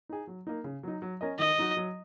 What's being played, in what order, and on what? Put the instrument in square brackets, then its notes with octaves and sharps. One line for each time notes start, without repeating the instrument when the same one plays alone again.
[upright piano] D#4 G#4
F#3
A#3 D#4
C#3
F#3 D#4
F#3
C#4 A#4 D#5
[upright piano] D#3 [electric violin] D#5
[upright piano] F#3 D#4 F#4
F#3